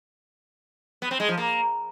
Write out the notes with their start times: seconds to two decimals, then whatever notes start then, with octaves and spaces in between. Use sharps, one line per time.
1.02 B3
1.11 C4
1.20 G#3
1.29 F3
1.38 A#3